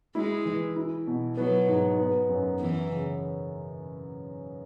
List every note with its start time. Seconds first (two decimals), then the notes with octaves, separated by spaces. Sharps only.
0.15 G#3 E4
0.45 E3
0.76 E4
1.07 B2
1.37 F#3 B3
1.68 G#2
1.99 B3
2.29 F#2
2.60 E3 B3
2.90 C#3